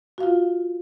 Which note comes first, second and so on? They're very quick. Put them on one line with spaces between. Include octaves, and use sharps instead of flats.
F#4 F5 F4